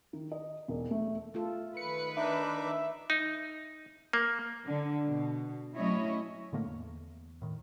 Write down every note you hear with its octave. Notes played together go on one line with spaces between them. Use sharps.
D#3
D#5
E1
A3
A3 F4 A4
D#3 B4 C#7
D4 D#4 E5 D6
D#4
A#3
D3
B2
F#3 A3 C#4 E4 C#5 D#5
A2 D3 A3 A#3
E2
A2 D#3